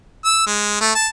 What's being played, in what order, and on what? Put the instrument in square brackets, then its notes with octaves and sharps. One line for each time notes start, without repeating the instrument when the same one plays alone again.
[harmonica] E6
G#3
A3
A5